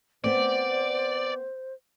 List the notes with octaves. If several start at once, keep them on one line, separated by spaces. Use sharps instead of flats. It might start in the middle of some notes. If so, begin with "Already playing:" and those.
B3 C4 C5 D5